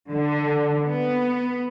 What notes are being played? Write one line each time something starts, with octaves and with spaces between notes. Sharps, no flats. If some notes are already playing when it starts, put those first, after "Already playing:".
D3
B3